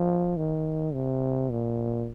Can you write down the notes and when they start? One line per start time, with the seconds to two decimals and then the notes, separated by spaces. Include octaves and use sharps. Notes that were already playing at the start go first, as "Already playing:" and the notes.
Already playing: F3
0.37 D#3
0.94 C3
1.50 A#2